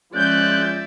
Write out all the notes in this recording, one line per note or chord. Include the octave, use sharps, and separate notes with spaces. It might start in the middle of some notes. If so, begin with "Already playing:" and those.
F3 G#3 C#4 D5 E5 F#6 G6